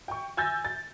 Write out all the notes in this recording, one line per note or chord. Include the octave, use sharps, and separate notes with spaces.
G5 C#6
G#5 E6 G6 A6 A#6
A6